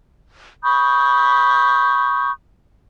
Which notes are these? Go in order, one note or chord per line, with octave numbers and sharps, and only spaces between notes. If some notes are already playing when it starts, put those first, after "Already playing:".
B5 C#6 D#6 G6